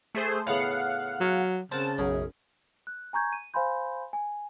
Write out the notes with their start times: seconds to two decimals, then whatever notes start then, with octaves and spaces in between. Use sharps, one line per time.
0.15 A3 G#4 C5
0.47 A2 C#3 B3 F5 F#5
1.20 F#3
1.72 C#3 C4 A#4 F#5 A5
1.98 B1 F#2 C#4 G#4 A#4
2.87 F#6
3.13 G#5 A#5 C#6 G6 G#6
3.33 D#7
3.54 C5 F5 G#5 B5 C6 G6
4.13 G#5